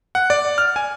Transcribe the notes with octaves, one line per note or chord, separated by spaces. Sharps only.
F#5
D5
F6
G#5